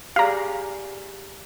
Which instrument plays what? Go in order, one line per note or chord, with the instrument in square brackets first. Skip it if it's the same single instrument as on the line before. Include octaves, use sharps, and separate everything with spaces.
[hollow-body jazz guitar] G4 G#4 D5 [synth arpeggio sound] F5 A#5